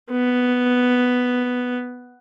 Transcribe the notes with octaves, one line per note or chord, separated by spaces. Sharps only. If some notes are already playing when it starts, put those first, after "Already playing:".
B3